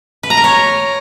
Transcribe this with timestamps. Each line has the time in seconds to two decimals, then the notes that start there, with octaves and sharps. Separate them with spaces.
0.23 B4
0.30 A#5
0.37 A#4
0.44 C#5